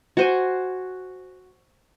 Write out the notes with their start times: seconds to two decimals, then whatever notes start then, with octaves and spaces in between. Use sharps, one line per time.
0.17 F#4 C5 G#5